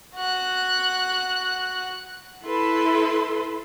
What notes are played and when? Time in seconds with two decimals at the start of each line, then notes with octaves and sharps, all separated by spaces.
0.15 F#4 F#6
2.45 E4 A4 B4 C6